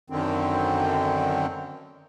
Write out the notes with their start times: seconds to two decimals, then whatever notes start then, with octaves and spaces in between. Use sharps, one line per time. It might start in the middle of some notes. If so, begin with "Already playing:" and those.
0.10 F#2 D3 D#3 C4